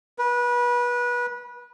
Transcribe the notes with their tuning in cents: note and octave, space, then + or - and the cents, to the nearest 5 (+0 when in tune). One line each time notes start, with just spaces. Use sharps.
B4 -25